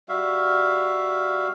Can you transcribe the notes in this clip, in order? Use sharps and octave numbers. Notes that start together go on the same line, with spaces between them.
G3 F#4 E5 F5